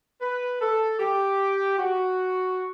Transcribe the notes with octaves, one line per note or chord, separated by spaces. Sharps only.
B4
A4
G4
F#4